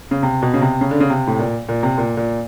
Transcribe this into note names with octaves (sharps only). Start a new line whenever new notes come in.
C#3
C3
B2
C#3
C3
C#3
D3
C#3
C3
A2
A#2
A#2
C3
A#2
A#2